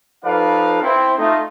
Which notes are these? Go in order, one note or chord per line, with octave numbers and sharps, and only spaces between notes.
F3 D#4 A4 B4 D5 F5
C4 E4
A3 D#4 F4